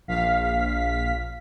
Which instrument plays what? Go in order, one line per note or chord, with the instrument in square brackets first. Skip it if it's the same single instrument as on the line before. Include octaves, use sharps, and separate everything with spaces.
[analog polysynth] A#1 F5 B6